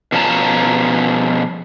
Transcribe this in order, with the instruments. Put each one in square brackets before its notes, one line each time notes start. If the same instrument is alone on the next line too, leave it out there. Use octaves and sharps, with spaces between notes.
[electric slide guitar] B2 F3 C#4 F4 A5 A#5